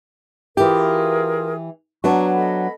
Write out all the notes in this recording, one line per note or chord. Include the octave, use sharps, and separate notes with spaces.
E3 F4 G4 G#4 A#4
F#3 B3 D4 A#5 C#6
A4 D#5 B5